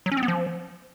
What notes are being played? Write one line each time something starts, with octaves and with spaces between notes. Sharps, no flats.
F#3
C#4
C4
B3
F3